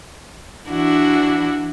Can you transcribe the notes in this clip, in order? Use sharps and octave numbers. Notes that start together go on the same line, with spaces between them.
E3 D4 E4 F#4